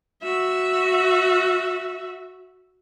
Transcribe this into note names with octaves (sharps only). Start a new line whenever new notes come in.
F#4 E5